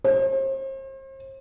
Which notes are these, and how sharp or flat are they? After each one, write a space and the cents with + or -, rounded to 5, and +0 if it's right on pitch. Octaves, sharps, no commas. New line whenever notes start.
C5 +40